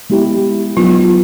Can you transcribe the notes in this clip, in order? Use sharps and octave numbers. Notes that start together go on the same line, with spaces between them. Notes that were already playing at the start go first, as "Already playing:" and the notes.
G#3 B3 E4 G4
F#3 B3 D#4 F4